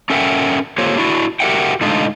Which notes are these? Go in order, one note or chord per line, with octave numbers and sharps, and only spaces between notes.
C#4 A4 A#4 E5 F#5 G5
A#3 F4 G4 A4 C5 C#5
D4 E4 F#4
F#4 G4 A#4 E5 F#5 G5
A2 D3 G#3 D4 D#4 F4